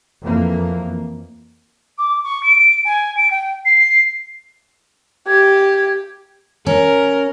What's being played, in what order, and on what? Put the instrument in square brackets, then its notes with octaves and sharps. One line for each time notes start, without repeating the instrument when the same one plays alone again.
[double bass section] F2 E3 A#3
[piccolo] D6
C#6
D7
G#5
D7
G5
C7
[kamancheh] G4 [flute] G#6
[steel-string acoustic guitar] C#4 [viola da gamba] A#4